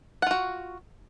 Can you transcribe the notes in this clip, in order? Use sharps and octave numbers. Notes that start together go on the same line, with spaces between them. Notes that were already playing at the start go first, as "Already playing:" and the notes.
F4 F#4 F#5